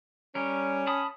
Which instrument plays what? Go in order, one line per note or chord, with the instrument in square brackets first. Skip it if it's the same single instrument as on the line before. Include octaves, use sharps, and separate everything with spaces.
[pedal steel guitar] G3 A#4 [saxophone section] C#4
[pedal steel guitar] A5 B5 D#6